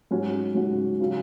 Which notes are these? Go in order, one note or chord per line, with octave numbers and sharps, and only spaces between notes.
G#2 F#3 C#4 F#4
G#2 F#3 C#4 F#4
C#3 F#3 C#4